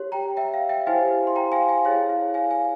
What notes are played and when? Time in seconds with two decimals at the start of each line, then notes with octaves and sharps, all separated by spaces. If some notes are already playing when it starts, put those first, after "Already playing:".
Already playing: G4 C#5
0.12 G5 A#5
0.37 E5 G5
0.54 F5
0.69 E5 G5
0.86 E4 G4 C5 F5 G#5
1.27 C6
1.36 G5 A#5
1.52 F5 G#5
1.69 F5 G#5
1.85 E4 G#4 C#5 F5
2.09 F5
2.34 F5 G#5
2.51 F5 G#5